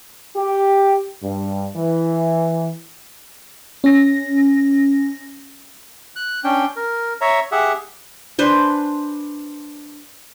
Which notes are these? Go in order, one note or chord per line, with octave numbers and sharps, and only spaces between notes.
G4
G2
E3
C#4 A#6
F#6
C#4 D4 G5
A#4
C#5 E5 A#5
G4 G#4 E5 F#5
D4 B4 C5 G#5